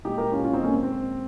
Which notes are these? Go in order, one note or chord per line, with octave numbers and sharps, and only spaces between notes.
A#2 G#3 D#4 G4
G4 A#4
C#4 F4
C#4 F4
C4 D#4
A#3 C#4
C4
C4